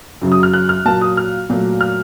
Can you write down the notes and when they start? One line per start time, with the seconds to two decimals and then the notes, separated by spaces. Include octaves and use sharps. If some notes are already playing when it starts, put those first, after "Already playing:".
0.22 F#2 C#3 F#3
0.32 D#6
0.43 F6
0.53 F#6
0.69 F6
0.85 A#2 F#3 A#3 A5
1.01 D#6
1.17 F6
1.50 A#2 F#3 A3
1.81 F6